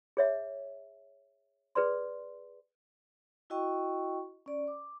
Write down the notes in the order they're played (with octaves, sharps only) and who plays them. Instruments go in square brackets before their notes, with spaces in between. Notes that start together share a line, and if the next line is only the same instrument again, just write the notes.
[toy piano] G#4 C#5 E5
G#4 B4 D5 C6
[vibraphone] E4 F#4 D#5 G5 C#6
C#4 D5
D6